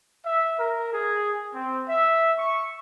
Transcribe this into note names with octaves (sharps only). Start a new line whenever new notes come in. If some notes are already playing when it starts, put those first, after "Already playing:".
E5
A#4
G#4
C4
E5
C#6